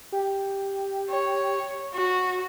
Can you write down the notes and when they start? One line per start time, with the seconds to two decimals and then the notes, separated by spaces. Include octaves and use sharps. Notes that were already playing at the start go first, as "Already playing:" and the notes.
0.12 G4
1.10 C#5
1.94 F#4